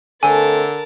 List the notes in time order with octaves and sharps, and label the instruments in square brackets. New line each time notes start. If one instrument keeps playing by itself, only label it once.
[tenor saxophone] D3 [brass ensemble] A3 C4 A4 [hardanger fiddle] A#4 A5 [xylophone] G#5